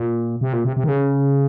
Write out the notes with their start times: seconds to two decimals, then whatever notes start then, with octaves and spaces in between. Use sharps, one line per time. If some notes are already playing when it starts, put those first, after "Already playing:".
Already playing: A#2
0.41 C3
0.53 A#2
0.65 C3
0.77 C3
0.84 D#3
0.89 C#3